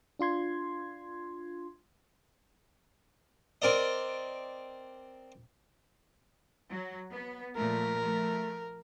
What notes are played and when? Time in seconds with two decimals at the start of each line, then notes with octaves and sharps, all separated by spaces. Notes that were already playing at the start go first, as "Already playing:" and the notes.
0.19 D4 F4 C6 G#6
3.62 C4 A#4 D5 D#5
6.70 F#3
7.12 B3
7.56 A#2 F3 A3 A#4
7.99 F3 A3